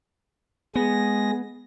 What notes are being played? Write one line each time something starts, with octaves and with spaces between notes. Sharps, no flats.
G#3 B3 G#4 A#6